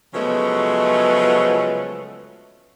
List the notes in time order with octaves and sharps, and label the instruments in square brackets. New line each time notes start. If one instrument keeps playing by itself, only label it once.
[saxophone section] C#3 F3 F#3 G#3 A3 B3